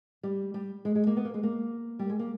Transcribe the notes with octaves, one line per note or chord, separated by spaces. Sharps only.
G3
G3
G#3
G#3
A#3
B3
A#3
G#3
A#3
G3
G#3
A#3